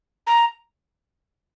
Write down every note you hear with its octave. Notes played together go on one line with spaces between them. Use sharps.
A#5